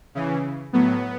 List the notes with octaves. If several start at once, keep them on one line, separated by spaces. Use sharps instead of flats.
C#3 E3
A2 F#3 B3